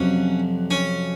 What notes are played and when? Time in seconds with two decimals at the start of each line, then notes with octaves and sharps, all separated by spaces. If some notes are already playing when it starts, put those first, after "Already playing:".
Already playing: F2 C3 F#3 C#4
0.71 C#4